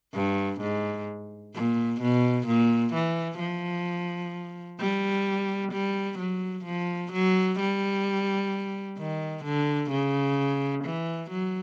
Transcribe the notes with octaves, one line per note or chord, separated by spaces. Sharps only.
G2
G#2
A#2
B2
A#2
E3
F3
G3
G3
F#3
F3
F#3
G3
D#3
D3
C#3
E3
F#3